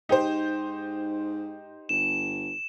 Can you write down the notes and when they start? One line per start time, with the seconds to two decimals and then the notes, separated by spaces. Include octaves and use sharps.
0.09 G#2 D#4 G4 C5
1.89 G1 E7